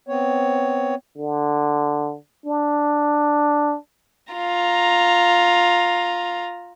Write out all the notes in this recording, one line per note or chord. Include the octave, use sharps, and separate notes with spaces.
B3 C4 C#5
D3
D4
F4 A#5